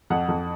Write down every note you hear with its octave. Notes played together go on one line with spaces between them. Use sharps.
F2 F#5
F2